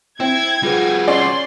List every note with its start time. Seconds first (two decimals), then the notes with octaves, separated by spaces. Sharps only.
0.20 C4 E4 G#6
0.63 G3 F4 F#4 G#4 B4
1.07 C#4 D5 C6